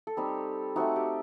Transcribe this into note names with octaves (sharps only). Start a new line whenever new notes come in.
A4
G3 C4 D#4 G4
A3 C4 D#4 F#4
G4